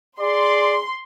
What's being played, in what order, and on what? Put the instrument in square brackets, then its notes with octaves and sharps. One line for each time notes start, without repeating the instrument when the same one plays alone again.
[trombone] G#4 [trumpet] D5 [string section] C6